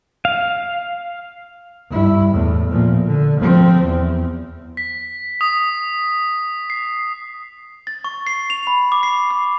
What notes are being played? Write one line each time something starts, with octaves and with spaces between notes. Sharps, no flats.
F5
G2 E4
E2 A2
A#2 F3
D3
F3 C4
E2
B6
D#6
C7
A6
C#6
C7
F7
B5
D6
C7
D6